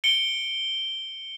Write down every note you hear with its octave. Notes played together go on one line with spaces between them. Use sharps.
C#7 D7 G7